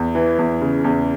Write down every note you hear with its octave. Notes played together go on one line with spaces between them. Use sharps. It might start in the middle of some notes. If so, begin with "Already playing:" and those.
Already playing: E2
E3
E2
C#3
E2